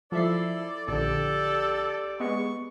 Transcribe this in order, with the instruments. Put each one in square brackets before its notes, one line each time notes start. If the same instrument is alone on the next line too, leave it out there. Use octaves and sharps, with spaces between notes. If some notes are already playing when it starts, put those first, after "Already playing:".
[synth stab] F3 E5 C7 [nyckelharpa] E4 A4 [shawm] D5
[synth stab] A#1 D3 [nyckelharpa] G4 D5 [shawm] A4
[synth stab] G#3 B3 [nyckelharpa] C#6